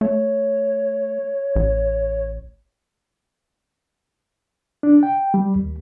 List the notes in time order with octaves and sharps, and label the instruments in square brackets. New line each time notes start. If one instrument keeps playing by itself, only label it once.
[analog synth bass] A3 [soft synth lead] C#5
[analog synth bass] A1
[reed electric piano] D4
G5
G3
D#2